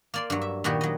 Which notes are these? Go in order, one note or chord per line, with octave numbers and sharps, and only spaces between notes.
A#3 D5 C6
G2 F#3
E5
A#2 D#3 B3 F#4 G4
F#3 D#5